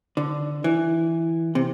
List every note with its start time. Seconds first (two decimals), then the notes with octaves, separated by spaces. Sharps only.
0.17 D3
0.64 E3
1.55 C3